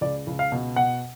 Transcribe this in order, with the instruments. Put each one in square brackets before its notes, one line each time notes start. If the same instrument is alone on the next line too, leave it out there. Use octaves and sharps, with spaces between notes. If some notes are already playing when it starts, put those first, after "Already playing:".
[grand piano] C#2 D5
C#2
F5
B2
B2 F#5